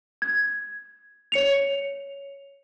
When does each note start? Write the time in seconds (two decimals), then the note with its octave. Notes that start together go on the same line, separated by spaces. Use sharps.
0.22 G#6
1.32 C#5 C#7 F7